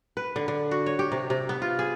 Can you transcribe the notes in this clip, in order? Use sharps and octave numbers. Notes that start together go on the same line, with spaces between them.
B4
D3
D3
F#4
C#5
G4
C3
C3
B3
F4
G#4